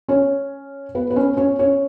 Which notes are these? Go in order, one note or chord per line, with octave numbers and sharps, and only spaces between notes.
C#4 C#5
B3 B4
B4
C#4 C#5
C#4 C#5
C#4 C#5